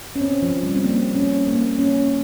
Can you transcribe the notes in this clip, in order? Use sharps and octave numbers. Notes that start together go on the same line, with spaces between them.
C#4
C4
F3
G3
C4
A#3
C#4
A#3
C#4